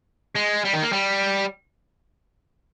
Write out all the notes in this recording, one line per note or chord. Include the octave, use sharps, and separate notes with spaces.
G#3
G3
D#3
A#3
G3